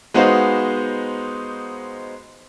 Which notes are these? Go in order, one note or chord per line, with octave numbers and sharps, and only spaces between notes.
G#3 B3 D#4 F#4 C5 F5